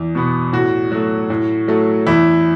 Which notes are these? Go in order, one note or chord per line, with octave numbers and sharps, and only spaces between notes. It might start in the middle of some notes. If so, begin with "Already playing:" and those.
Already playing: E2
B2 B3
A2 F#4
F#3 A3
A2
F#3 A3
E2 E4